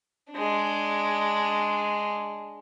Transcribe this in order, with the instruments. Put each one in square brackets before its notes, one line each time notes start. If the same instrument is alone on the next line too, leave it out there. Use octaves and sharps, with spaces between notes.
[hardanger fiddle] G#3 D4